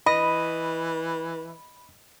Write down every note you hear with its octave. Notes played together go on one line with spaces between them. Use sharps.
E3 D#5 B5